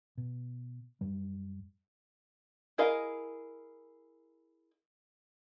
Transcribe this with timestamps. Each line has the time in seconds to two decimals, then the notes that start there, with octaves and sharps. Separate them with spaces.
0.18 B2
1.01 F#2 G3
2.78 E4 G#4 A#4 D#5 F5